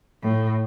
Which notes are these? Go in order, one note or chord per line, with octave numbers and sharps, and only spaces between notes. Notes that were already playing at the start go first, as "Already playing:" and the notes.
A2